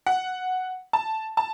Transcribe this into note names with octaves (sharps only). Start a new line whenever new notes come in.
F#5
A5
A5